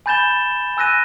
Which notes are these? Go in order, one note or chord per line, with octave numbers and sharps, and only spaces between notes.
G#5 B5 G6 A6 E7 G7
G#5 E6 F#6 A#6 D#7